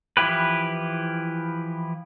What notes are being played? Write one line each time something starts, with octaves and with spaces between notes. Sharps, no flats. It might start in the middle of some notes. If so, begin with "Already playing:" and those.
E3 F3 E4 G4 B4